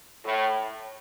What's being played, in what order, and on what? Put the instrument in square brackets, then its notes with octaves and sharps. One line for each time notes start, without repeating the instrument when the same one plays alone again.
[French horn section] A2